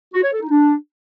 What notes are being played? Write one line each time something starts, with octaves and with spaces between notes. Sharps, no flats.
F#4
C#5
A4
D#4
D4